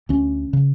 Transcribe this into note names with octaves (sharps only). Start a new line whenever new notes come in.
D2 C#4
C#3